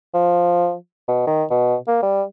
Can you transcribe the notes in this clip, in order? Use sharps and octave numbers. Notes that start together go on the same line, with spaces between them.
F3
B2
D#3
B2
A#3
G3